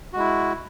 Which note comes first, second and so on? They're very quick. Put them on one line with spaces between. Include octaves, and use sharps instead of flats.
F#4 G#3 E4